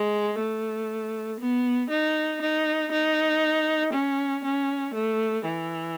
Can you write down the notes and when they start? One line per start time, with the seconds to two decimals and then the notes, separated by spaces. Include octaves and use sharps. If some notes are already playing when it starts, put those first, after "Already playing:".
Already playing: G#3
0.39 A3
1.39 B3
1.90 D#4
2.42 D#4
2.91 D#4
3.93 C#4
4.44 C#4
4.94 A3
5.45 E3